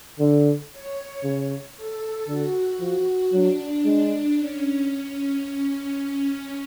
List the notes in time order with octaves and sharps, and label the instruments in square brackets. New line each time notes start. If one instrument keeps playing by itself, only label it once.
[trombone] D3
[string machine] C#5
[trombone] C#3
[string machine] A4
[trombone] D3 [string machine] F#4
[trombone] F3
[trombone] F#3 [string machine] D4
[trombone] G#3 [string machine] D4
[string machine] C#4